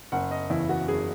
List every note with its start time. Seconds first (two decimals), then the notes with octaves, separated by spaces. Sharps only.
0.12 F#1 F#5
0.31 D#5
0.50 E2 C#3 E4
0.69 F#4
0.88 F#1 G#4